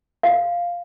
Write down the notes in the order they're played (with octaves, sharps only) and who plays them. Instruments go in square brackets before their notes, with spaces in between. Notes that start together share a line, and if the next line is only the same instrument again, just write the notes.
[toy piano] F5